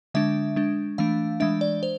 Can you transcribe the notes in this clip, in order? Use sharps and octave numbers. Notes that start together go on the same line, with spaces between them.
D3 G#3 D4 E5
G#3 D4
E3 A3 D4 F5
E3 G#3 D4 E5
D5
C5